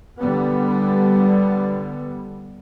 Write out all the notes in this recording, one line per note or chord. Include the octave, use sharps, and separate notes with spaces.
D3 G3 B3